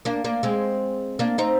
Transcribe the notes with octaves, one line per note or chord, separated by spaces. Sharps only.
A#3 D4
A#3 D4
G#3 C4
A#3 D4
C4 D#4